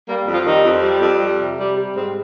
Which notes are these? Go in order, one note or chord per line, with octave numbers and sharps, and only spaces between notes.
G3 A#3
F2
F3 F4
D#3 G3 D#4
F2
G3
F2
G3
C3
G3
G3
G#2 C4